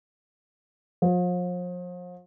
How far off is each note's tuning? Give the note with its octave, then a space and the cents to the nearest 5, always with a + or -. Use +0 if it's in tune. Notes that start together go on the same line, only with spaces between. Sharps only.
F3 +40